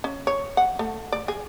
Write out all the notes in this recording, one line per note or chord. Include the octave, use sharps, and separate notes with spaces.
C#4
C#5
F#5
A3
D5
G#4